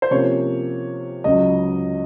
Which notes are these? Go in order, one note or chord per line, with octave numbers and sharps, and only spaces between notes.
C5
C3 F3 A#3 C#4 C#5
C#2 C#3 F#3 D#5